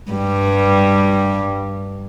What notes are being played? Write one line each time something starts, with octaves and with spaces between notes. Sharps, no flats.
G2 G3